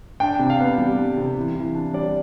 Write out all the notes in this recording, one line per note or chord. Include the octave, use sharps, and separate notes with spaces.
D4 G5
C3
F5
B3
G3
D4
C3
E3
E3
D4
G3 D5